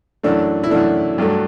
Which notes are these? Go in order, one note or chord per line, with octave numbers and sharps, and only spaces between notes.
F#2 E3 A3 D4
E4
F#2 E3 A3 D4
G2 F#3 A3